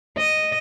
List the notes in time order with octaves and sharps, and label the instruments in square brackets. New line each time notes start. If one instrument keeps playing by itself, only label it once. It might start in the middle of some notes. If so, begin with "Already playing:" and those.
[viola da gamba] D#5